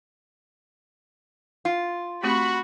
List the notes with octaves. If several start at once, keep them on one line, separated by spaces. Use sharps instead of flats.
F4
A3 C4 F#4 G4 B5 C#6